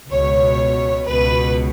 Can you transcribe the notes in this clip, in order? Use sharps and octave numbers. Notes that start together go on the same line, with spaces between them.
C#2 B2 C#5
C#2 B2 B4